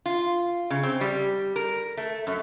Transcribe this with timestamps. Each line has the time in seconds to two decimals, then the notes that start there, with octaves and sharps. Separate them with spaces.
0.06 F4
0.70 C#3
0.83 C4
1.01 G3
1.56 A#4
1.97 A3
2.27 F#2